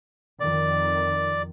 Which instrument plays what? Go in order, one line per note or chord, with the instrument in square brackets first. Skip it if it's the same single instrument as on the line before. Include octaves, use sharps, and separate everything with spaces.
[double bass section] F2 D#3 [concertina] D5